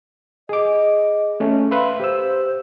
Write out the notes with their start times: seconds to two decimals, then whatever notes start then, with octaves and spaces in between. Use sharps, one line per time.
0.49 G#4 D#5 D6
1.40 A3 C#4
1.71 B4 E5 F5 C6
2.00 G4 C5 E6